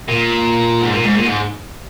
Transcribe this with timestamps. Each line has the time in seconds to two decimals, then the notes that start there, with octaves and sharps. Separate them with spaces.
0.08 A#2
0.81 G#2
0.92 A#2
1.03 G#2
1.15 A#2
1.25 G#2